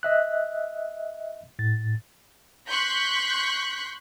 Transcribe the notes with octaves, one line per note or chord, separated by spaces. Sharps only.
D#5 E5 F#6
A2 A6
C6 C#6 F#6 G6 B6